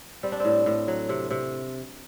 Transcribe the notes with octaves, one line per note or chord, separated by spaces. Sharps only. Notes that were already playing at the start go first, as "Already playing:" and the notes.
G3 C4
D4
A2 C4
A2
F#3
C3
C3